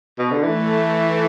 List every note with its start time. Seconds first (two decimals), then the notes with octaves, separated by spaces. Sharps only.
0.19 B2
0.31 D3
0.43 E3 A3